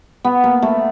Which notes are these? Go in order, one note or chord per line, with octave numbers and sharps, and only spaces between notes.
B3
A#3
A3